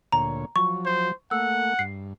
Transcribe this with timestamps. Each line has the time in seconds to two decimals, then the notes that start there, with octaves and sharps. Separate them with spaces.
0.12 D2 A#2 C#5 A#5
0.56 F3 F#3 C#6
0.86 C5
1.31 A3 A#3 F#5 E6
1.79 G2 C7